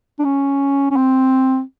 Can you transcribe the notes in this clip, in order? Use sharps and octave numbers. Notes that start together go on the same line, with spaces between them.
D4
C#4
C#4
C4